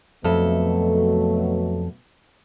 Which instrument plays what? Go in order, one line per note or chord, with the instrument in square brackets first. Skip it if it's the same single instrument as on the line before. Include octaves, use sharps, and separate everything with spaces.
[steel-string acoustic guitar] F2 A4 E5 [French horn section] B2 F#3 A3